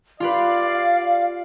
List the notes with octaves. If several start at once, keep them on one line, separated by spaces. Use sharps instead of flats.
F4 G4 B4 D5 F5